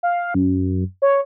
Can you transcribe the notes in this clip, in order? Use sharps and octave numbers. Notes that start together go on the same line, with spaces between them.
F5
F#2
C#5